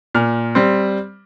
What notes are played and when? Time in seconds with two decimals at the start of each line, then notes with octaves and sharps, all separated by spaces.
0.15 A#2 F6
0.55 G3 C4